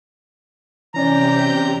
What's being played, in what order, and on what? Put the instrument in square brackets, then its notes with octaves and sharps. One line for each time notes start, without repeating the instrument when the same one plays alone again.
[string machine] C3 G4 G6 [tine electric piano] E3 C#4 D5 [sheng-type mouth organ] A#5